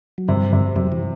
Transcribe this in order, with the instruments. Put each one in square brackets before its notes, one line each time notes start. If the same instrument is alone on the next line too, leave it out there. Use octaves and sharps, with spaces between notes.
[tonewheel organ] F#3
[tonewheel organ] G2 G3 [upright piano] C3
[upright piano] C3
[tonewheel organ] F#2 F#3 [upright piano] C3
[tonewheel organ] E3